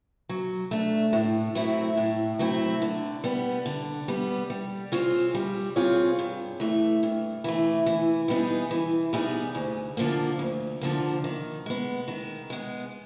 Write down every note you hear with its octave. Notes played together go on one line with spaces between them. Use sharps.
F#3
A3 D4
A2
F#3 A3 C4 E4
A2
F#3 A3 C4 E4
D3
G3 B3
D3
G3 B3
G3
C4 F4 G#4 C#5
G3
C4 F4 G#4 C#5
G2
E3 A3
G2
E3 A3
E3
G3 B3 D#4 G#4
E3
G3 B3 D#4 G#4
D2
D3 F3 A#3
D2
D3 F3 A#3
D#3
G#3 B3
D#3
G#3 B3